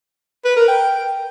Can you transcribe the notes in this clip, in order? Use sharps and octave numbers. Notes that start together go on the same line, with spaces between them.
B4
A#4
G5